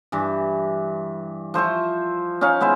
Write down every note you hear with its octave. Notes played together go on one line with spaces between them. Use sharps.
G2 E3
F3 C5 E5 C#6
C#4 D#4 C#5 F5
G#3 B3 E4 C5